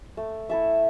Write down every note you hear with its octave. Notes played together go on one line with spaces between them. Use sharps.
A3
E4 A4 E5